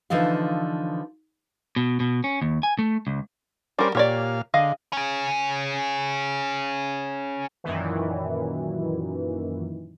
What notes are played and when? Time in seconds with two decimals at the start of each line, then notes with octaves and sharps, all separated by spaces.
0.10 D3 E3 F3 D#4 F5
1.76 B2
2.00 B2
2.24 C#4
2.42 D#2
2.63 G#5
2.79 A3
3.07 C#2
3.79 G3 C#4 A#4 C5 D5
3.95 A#2 G4 C#5 D5 F5
4.54 D3 G#4 D#5 F5
4.93 C#4 G#4
7.64 F#2 A#2 D#3 E3